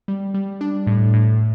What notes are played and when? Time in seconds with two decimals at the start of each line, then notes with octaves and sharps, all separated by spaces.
0.08 G3
0.34 G3
0.61 D4
0.87 A2
1.13 A2